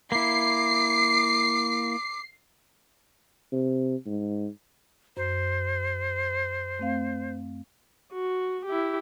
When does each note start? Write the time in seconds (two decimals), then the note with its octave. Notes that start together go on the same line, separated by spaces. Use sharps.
0.12 A#3 E4 D6 C7
3.52 C3
4.06 G#2
5.17 F#2 C5
6.79 A3 C4 F5
8.12 F#4
8.66 E4 G4